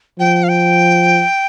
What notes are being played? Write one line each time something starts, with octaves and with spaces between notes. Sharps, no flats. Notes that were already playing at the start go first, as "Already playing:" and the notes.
F3 G5
F5
G5